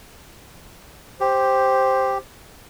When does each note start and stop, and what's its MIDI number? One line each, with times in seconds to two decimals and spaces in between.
1.20 2.18 67
1.20 2.18 72